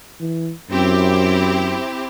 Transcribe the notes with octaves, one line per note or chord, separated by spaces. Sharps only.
E3
F#2 C4 E4 G4